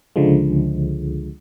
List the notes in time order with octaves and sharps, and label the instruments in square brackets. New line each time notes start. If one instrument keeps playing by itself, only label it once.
[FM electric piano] C#2 D3 F3 G#3